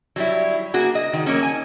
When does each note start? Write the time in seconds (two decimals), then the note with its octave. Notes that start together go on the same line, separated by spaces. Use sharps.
0.16 F#3 G3 E4
0.74 A#3 F#4 G#4
0.95 D#5
1.13 D#3
1.26 F#3 A#3 C#4
1.43 G#5